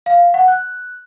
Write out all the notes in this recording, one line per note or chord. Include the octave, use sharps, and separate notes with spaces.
F5
F#5
F#6